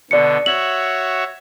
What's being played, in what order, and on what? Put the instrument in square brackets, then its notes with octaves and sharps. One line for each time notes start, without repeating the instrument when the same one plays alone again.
[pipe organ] B2 D3 [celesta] D5 C#7
[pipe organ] F#4 C#5 E5 [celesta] F#7